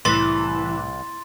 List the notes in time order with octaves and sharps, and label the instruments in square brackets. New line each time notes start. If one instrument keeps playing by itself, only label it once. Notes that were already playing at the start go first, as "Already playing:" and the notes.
[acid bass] C2 [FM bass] A2 [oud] E3 [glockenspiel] C6 A6